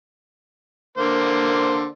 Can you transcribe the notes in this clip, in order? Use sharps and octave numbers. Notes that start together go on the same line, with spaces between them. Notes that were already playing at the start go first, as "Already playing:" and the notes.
D3 A#3 C5